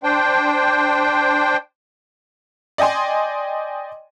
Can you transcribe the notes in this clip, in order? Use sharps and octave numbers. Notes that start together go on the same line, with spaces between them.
D4 C5 G5
D5 D#5 G5 G#5 C6